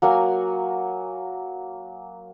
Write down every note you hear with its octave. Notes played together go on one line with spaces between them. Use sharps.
F#3 A#3 F#5 G#5